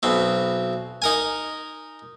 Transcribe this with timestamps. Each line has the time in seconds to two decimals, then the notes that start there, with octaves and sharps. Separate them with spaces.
0.03 B1 B2 C4
1.02 D#4 A#4 G#5